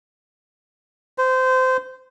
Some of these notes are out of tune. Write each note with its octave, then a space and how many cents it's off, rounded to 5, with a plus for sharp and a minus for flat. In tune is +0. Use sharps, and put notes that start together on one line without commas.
C5 -20